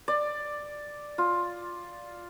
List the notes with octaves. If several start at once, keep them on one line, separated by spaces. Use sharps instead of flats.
D5
F4